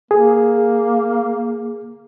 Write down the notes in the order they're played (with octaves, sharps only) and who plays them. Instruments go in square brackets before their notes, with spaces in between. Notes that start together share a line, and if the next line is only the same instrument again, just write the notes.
[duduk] A#3 [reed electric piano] G#4